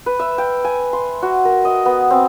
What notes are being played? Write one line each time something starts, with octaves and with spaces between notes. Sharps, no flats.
B4
E5
G5
G#5
C6
F#4
A#4
D#5
B3
C4